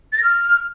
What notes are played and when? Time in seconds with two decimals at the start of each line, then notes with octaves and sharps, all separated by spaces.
0.13 A6
0.18 A#6
0.23 F6